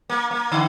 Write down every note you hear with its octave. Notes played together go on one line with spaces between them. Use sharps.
A#3
A#3
D3